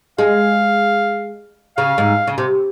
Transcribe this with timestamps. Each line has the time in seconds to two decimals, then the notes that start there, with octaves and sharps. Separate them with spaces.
0.18 G#3 F5
1.77 C#3 F5
1.98 G#2
2.27 C#3
2.38 C3